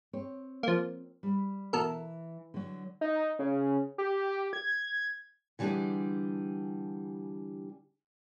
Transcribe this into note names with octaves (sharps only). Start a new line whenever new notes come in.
C4 C#5
F3 A#3
G3
B2 E3 A4 A#4
D3 F#3
D#4
C#3
G4
G#6
D3 E3 G3 D4 G4 G#4